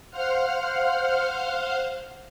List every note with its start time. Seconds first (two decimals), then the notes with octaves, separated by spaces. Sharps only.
0.11 C5 F5 F#5 F6